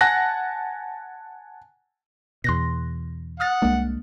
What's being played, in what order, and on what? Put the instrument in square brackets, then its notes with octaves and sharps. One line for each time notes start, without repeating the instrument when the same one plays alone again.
[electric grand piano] F#5 G#5 A5 F#6 A#6
[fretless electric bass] E2 B2 [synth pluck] C6 F#6 A#6
[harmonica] F#5 [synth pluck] D#6 F6 A6
[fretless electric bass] C2 G#3 [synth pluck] A#3 D4